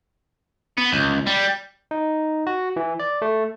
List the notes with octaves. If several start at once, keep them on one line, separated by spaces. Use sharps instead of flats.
B3
C#2
G3
D#4
F#4
E3
D5
A3